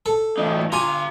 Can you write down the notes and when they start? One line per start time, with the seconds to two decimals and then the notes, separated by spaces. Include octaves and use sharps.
0.06 A4
0.38 A2 E3 D#4
0.72 F4 G4 G#5 A#5